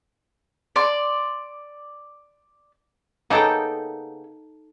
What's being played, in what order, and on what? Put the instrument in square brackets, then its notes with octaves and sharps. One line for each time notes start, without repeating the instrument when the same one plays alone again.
[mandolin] D5 C6
[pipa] C#3 A#3 B3 [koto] D#4 A4 G5